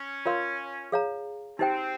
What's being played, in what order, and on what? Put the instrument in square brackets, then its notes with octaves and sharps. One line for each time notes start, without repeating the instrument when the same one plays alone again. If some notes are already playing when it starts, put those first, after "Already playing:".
Already playing: [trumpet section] C#4
[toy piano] F4 A#4 C#5 F5 C6
G#4 C#5 F5 A#5
[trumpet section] C4 [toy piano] D#4 G4 C5 G5